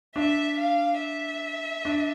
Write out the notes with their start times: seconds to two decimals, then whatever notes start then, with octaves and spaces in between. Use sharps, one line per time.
0.16 D4 E5
0.59 F5
1.01 E5
1.85 D4